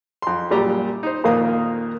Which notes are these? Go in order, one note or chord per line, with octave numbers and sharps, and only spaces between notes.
F2 C6
F#2 A#2 G3 G4 A#5
D#4 C5
F2 A#2 D#3 A#3 F5 D#6